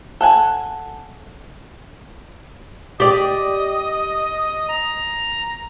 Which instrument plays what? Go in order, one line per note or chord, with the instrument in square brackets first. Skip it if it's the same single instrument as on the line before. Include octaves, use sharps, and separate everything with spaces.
[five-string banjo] A4 F#5 G#5
[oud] G4 D5 [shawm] D#5
[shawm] A#5